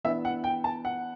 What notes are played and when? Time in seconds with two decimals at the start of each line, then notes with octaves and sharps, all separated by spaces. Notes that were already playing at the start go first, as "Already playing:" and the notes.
0.04 E3 B3 D4 E5
0.25 F#5
0.44 G5
0.64 A5
0.85 F#5